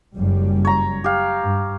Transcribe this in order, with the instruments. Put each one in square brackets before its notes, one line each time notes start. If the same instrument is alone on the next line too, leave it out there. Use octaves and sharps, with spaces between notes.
[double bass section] F#1 F#2 G3
[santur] C#5 A#5
G4 F5
[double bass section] G2